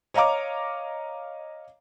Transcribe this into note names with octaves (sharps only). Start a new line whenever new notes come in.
C#5 D#5 F5 A#5 D6